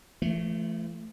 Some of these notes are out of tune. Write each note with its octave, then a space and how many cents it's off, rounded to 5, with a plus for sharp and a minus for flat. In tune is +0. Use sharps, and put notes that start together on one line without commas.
F3 -45 A3 +0